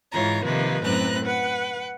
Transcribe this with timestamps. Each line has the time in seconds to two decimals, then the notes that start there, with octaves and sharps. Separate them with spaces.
0.12 G#2 E3 F4 C#5 A#5
0.44 C3 D#3 F3 A#3 B4
0.84 F#2 A2 C4 B4 A#5 F#6
1.24 B4 F#5